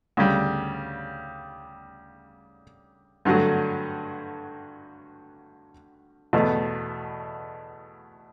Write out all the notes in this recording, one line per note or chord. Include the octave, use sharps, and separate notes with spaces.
D2 C#3 G3
G2 D3 F#3 A3
E2 B2 A3